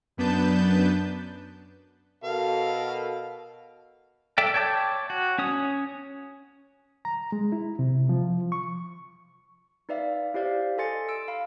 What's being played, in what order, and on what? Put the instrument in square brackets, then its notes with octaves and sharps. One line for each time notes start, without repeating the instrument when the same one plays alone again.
[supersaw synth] F#2 B3 D4 B4 A5 G6
[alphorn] B2 [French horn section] F#4 A#4 [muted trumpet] A4 [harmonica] F5
[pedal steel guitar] A4 D5 E5 G5
C#5 G5 A5 D6 G6
F#4
C#4 C#5 D#6
[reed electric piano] A#5
G#3
E4
C3
F3
C#6
[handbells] D#4 B4 D5 E5 F5
E4 G4 C5 D5 E5 F5
A4 D#5 G#5 C6 A6 C#7
E6 D7
F5 B5